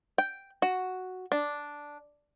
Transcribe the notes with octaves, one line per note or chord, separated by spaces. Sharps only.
G5
F#4
D4